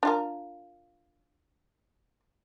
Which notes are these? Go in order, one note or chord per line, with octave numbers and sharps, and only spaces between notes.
D4 F4 A#4